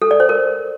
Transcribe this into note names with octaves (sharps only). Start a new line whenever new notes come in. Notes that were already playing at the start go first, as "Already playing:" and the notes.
A4
D5
C5
A#4